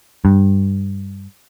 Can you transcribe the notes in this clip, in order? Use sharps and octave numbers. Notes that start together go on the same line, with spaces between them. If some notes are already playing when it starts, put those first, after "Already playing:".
G2